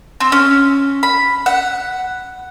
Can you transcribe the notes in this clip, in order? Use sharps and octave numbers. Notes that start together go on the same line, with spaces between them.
C4
C#4
B5
F#5